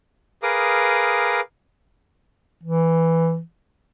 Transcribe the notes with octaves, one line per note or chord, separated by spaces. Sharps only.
G#4 A#4 B4 F5 D6 D#6
E3